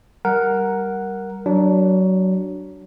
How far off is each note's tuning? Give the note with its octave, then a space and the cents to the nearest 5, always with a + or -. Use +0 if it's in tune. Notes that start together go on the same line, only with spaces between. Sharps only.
G3 -15 A#4 +0 F#5 +0
F#3 +20 D4 +0